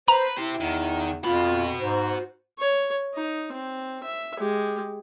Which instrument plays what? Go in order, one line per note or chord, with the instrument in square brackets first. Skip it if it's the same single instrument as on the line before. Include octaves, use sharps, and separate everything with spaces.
[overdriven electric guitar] B4 [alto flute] C5 [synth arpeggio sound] A#5
[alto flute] E4 [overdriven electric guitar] G4 C5
[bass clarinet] E2 [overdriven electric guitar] D#3
[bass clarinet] F2 [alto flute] F4 [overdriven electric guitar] F#4 B5
[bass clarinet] G#2 [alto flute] C5
[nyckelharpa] C#5
D#4
C4
E5
G#3 G4